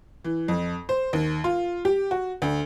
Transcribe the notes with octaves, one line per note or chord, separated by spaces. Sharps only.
E3
F2
C5
D#2
F4
G4
F#4
D2